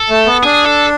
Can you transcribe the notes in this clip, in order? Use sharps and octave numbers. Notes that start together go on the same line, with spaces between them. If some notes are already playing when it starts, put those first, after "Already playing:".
Already playing: A4
A3
B3
D4 G#4
A4